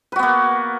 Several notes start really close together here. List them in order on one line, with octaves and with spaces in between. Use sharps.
B4 F#4 B3 A#3